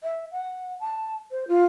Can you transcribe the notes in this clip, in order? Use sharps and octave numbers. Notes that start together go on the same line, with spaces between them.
E5
F#5
A5
C5
F4